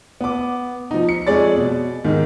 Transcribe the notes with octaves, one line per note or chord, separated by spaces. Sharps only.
B3 D6
F3 D#4
C#7
F2 G#3 G#4 C#5 D5 A6
B2
G#2 D#3